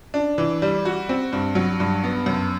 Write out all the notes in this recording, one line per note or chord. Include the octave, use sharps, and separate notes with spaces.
D4
E3
G3
F#4
C4
G2
F#3
G2
B3
F#2